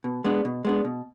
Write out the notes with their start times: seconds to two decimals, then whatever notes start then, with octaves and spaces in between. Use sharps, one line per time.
0.04 B2
0.24 G#3 B3 D4
0.45 B2
0.65 G#3 B3 D4
0.85 B2